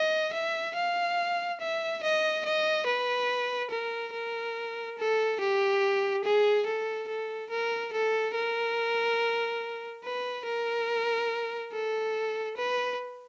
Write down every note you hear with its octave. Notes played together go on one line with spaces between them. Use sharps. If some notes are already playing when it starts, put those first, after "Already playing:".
Already playing: D#5
E5
F5
E5
D#5
D#5
B4
A#4
A#4
A4
G4
G#4
A4
A4
A#4
A4
A#4
B4
A#4
A4
B4